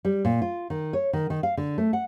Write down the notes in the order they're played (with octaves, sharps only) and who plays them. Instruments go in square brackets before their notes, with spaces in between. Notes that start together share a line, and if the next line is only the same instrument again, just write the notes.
[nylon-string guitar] G3
A#2
F4
D#3
C#5
D#3
D#3
F5
D3
A3
F#5